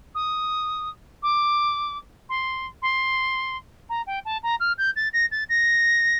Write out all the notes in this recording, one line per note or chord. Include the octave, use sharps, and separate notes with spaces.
D#6
D6
C6
C6
A#5
G5
A5
A#5
F6
G6
A6
A#6
A6
A#6